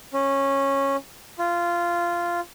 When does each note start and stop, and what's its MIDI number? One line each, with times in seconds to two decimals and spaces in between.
0.13 0.96 61
1.39 2.40 65